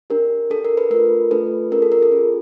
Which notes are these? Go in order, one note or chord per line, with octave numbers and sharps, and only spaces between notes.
D4 G4 A#4
D4 G4 A4
A#4
A4 B4
A3 D4 F4 A#4
A3 D4 F4 A4 B4
C#4 F4 G#4 A#4
A4
A#4
A4
C#4 F4 G#4